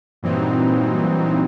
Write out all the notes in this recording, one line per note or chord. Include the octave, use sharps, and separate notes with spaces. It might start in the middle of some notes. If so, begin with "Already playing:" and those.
G2 A#2 E3 F#3 C4 D#4